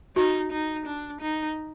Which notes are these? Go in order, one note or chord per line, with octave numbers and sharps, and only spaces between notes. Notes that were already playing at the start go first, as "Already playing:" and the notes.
D#4 F#4
D#4
D4
D#4